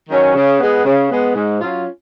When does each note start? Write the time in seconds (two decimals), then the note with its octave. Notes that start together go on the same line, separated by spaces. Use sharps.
0.10 D#3 F#3 C#4
0.35 C#3
0.60 G#3 B3
0.85 C#3
1.11 G#3 B3
1.36 G#2
1.61 F#3 C#4 F4